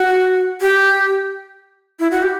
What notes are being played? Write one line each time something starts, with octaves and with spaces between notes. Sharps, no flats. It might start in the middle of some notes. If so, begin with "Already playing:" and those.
Already playing: F#4
G4
E4
F#4
G4